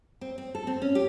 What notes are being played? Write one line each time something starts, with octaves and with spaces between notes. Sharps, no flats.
C4
C4
A4
C4
C#4
G4